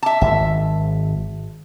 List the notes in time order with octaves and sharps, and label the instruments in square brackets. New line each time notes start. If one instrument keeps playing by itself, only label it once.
[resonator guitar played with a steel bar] E5 A5
[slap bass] G#1 [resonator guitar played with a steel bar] E5